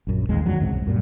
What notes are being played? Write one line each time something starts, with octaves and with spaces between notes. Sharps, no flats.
A#1 F#2
A1 D#2 G#3 C4
F2 D3 D#3 F#3
C#2 G#2 C3
C2
F#2 A#2 G3